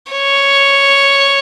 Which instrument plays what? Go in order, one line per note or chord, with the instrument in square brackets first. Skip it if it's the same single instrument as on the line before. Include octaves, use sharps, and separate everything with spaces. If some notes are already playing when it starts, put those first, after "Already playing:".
[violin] C#5